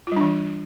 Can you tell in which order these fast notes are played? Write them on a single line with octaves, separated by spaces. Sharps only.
F4 G3 D4 E3